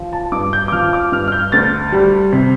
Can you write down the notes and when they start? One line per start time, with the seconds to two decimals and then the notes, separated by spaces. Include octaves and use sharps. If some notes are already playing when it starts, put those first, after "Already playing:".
Already playing: F3
0.13 A5
0.32 G2 D6
0.53 G6
0.68 D6
0.72 F3 F6
0.93 D6
1.12 G2 F6
1.28 F6
1.32 G6
1.52 D2 A6
1.92 G3
2.32 C3